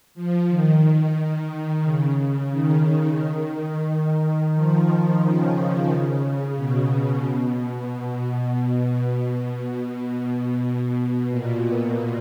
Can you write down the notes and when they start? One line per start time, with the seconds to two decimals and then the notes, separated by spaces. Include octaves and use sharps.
0.14 F3
0.49 D#3
1.83 C#3
2.51 D#3
4.54 F3
5.21 C#3
6.56 B2
9.27 B2
11.30 A#2